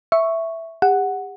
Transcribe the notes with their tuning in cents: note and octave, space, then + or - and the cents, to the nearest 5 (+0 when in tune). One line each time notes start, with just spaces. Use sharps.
E5 +0 C#6 +0
G4 +40 F#5 +0